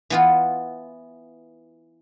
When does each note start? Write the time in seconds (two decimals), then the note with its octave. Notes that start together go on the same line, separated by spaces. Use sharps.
0.10 E3 B3 F4